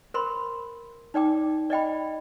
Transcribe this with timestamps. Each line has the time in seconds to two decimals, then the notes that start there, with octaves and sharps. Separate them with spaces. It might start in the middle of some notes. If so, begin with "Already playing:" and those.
0.14 A#4 C5 B5 C6
1.14 D#4 D5 G5 D6
1.70 D5 D#5 G5 B5